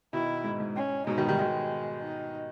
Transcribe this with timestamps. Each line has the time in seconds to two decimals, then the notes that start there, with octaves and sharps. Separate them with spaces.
0.13 B2 D#3 E4
0.44 G#2
0.60 G#2
0.76 C#4
1.07 G#2 B2 D#4
1.18 B2 D#3
1.29 D#3 G3
1.39 B2 D#3 G#3
2.03 D#4